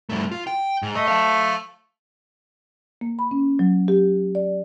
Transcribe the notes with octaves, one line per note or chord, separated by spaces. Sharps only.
G2 A3
F4
G5
G#2
A3 D#5
F5 A5
A#3
B5
C#4
F#3
G4
D5